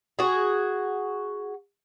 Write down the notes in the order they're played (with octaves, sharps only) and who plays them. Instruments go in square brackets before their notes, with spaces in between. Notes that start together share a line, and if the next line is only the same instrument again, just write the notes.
[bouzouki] F#4 G#4